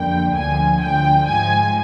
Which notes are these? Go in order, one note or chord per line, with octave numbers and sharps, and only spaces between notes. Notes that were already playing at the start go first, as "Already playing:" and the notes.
Already playing: F2 D3 G3 A#3 G5
D2 D3 F3 G#5
D2 D3 F3 G5
G#2 F3 G#3 G#5